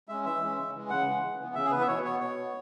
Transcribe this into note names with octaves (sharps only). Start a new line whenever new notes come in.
G#3 C#4 E5
E3 E5
G#3 C#4
C#3
E3 G#3
C#3 F#5
E3 G#3
C#3
E3 B3
C#3 E5
G#4
E3 B3 B4
E5
B2 C#5
B3 C#5
B2 C#5
B3